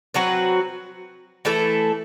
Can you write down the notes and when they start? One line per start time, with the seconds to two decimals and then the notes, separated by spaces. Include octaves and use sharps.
0.14 F#3 C4 F#4 B4
1.45 E3 A3 E4 A4